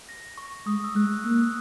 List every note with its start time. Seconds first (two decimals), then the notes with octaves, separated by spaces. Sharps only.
0.09 A#6
0.37 C#6
0.66 G#3 D#6
0.84 E6
0.95 G#3 F#6
1.19 F#6
1.25 A#3 E6
1.40 D#6